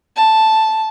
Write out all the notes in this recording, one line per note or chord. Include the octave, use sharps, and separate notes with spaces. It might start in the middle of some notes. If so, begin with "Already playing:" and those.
A5